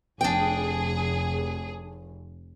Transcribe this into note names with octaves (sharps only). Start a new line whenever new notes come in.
F1 D4 G#4 G5